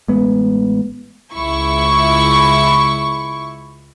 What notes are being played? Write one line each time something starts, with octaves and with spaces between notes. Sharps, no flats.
A1 G#3 B3
C#2 E4 C#6